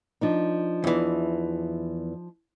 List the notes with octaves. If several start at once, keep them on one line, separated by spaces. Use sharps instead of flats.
F3 D4 D#4
E2 E3